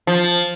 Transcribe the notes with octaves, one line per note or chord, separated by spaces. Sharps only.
F3